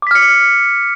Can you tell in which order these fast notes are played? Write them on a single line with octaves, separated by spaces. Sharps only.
D6 B6 F6 C#7